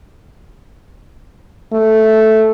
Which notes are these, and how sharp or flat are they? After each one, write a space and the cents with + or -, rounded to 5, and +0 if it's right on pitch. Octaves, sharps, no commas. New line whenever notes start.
A3 -5